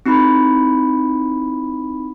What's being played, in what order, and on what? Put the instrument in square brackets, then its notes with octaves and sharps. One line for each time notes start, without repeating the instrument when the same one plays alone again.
[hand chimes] C4 D#4 E4 B5